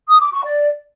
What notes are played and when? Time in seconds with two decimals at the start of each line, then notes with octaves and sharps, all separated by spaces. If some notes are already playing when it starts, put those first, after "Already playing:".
0.09 D#6
0.20 D6
0.32 C#6
0.44 D5